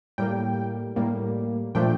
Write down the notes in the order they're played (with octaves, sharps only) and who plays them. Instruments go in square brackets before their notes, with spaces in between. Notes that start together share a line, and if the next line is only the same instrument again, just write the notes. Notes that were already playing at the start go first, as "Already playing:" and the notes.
[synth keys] A2 G3 A#3 G5
A2 G3 A#3
A#2 F3 A3 D4 G5